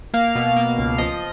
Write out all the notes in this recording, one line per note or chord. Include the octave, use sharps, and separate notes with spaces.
A#3 F5
B2
A#3
C#2
F3 D#5